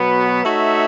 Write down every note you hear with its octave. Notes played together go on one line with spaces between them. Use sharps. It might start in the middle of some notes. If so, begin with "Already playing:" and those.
Already playing: B2 F#3 B3
A3 D#4 F#4 C#5 E5